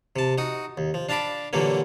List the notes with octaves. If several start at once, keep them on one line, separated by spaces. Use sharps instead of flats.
C3 A5
D#4 F#4 D#6
D#2
F3
D4 F5 A5 B5 D6
A#2 D3 E3 F#3 G3 A#3